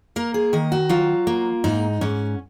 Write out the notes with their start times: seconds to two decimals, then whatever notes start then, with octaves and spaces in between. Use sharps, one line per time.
0.16 A#3 A#4
0.34 G#4
0.53 D#3 D#5
0.72 F#4
0.89 F#3 F4
1.27 A#3
1.64 G#2 D#4
2.01 G#2 C#4